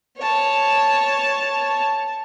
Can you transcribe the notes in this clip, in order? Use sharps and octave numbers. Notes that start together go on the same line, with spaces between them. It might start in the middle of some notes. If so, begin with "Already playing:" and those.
C#5 A5